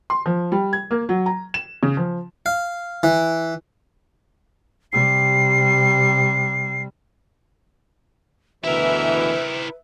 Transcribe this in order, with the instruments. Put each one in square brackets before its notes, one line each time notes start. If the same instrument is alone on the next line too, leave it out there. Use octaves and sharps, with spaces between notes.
[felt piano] C6
F3
G3
G#6
A#3
F#3
A#5
E7
C#3
F3
[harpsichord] F5
E3
[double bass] C3 G3 [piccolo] C7
[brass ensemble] D2 B2 E3 [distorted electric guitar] E4 A#4 [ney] B4 [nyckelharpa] E5